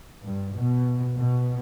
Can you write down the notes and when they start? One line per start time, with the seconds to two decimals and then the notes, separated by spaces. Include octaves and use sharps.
0.23 G2
0.55 B2
1.15 B2